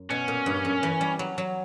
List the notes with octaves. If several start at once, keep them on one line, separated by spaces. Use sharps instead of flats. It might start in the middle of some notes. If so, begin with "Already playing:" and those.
Already playing: F#2
B2 C#4
A#2
G2
F#2
E3
G3
F#3
F#3